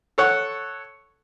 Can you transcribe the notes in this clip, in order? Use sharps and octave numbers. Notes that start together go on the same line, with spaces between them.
A4 C#5 F#5